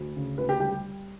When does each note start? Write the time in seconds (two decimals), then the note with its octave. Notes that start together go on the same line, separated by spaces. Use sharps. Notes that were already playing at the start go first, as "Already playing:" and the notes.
Already playing: D2
0.16 C#3
0.38 D2 B4
0.49 G4
0.60 G3 G4